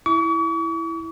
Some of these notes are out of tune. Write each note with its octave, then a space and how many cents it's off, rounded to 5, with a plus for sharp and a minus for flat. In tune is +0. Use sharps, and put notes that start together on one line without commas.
E4 +0 C#6 +45